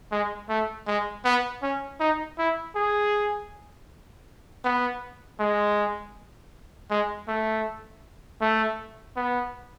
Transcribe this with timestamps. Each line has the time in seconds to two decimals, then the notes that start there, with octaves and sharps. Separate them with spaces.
0.12 G#3
0.49 A3
0.87 G#3
1.24 B3
1.62 C#4
2.00 D#4
2.38 E4
2.75 G#4
4.64 B3
5.39 G#3
6.90 G#3
7.28 A3
8.41 A3
9.17 B3